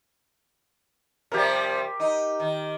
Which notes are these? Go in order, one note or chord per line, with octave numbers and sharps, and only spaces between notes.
C3 F3 G3 G4 A#4
D#4
D#3